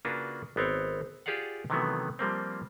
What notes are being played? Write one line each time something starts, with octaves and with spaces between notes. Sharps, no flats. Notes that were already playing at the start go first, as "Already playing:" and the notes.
C#3 A#3 D4 F4 F#4 B4
G#1 B3 C4 C#5
F4 G4 G#4 D5 F5 F#5
C3 D#3 E3 F#3 A3 B3
F3 G3 A#3 C4